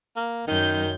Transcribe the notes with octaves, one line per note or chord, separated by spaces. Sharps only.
A#3
F#2 D#3 G6